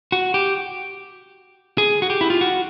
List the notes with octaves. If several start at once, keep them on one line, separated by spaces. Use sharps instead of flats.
F#4
G4
G#4
F#4
G4
E4
F4
F#4